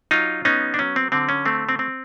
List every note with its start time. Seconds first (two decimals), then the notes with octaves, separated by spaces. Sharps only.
0.11 F#3 D#4 F4
0.45 B3 C#4 D#4
0.74 D4
0.79 F#3 C#4
0.96 C4
1.12 D3 C4
1.29 C#4
1.45 A3 C4
1.69 C4
1.79 C4